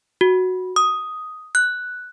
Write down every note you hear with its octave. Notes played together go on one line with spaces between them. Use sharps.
F#4
D#6
F#6